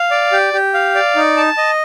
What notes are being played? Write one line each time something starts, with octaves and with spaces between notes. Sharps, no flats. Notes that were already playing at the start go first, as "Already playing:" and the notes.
Already playing: F5
D5
G4
G4
F5
D5
D#4
A5
D#5